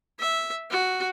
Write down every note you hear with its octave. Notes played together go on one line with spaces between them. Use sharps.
E5
F#4